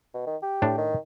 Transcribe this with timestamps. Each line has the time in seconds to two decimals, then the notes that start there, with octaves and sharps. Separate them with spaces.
0.14 B2
0.26 D#3
0.42 G4
0.62 A2 D4
0.78 D#3